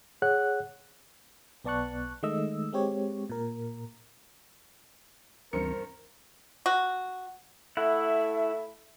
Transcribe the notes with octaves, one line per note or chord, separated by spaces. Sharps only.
G#4 C#5 F#5 F#6
B1 B3 D5 A5 C#6 F#6
D#3 G#3 A3 D#5 E6
G#3 C4 G4 C#5
A#2 A#4
D2 G2 E3 C4 A#4 C5 C#7
F#4
A3 E4 E5 F#5